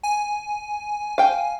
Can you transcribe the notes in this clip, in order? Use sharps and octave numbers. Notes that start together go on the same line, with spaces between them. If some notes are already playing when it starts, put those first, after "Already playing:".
G#5
F5 G5